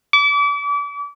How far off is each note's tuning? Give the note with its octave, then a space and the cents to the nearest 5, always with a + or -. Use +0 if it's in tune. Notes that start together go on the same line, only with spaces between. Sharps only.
D6 -35